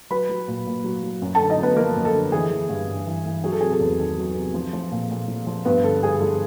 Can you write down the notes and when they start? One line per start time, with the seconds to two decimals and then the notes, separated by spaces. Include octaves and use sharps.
0.10 F#3 B4 B5
0.29 F#3
0.48 A#2
0.66 A#2
0.84 F#3
1.03 F#3
1.22 F#2
1.35 A4 A5
1.41 D3
1.50 D#4 D#5
1.58 F#2 B3 B4
1.76 F3 A#3 A#4
1.96 F#2
2.05 A4
2.14 D3
2.32 E3 G#4
2.51 E3
2.69 G2
2.88 G2
3.07 E3
3.26 E3
3.44 F#3 G#4
3.52 A4
3.61 C3 G#4
3.72 A4
3.80 E2
3.98 D#3 A4
4.18 F#3
4.36 C3
4.54 F3
4.73 F3
4.92 A#2
5.11 A#2
5.28 F3
5.47 F3
5.65 G2 B3 B4
5.83 D3 A4
6.03 G2 G#4
6.20 F3 A4